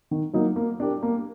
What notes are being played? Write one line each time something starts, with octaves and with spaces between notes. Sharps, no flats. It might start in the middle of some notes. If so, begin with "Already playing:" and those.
D#3
F#3 A#3 D#4
A#3
D4 G4 A#4
A#3